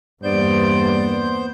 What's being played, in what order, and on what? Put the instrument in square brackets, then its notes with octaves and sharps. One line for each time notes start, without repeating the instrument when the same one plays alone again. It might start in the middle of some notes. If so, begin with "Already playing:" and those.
[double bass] E2 A#3 [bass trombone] G2 [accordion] B3 C5 G6 [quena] D5